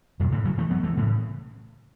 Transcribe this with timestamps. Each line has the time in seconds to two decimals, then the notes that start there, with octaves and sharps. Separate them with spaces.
0.20 F#2 B2
0.32 A2 C#3
0.45 C#3 F#3
0.58 E3 A3
0.71 F#3 B3
0.83 E3 A3
0.97 A2 C#3